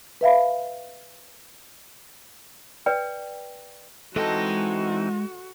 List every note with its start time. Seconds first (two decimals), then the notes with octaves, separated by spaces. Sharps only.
0.21 B4 E5 F5 B5
2.86 B4 D5 G5
4.16 E3 G#3 C4 D#4 F#4 A4 D#5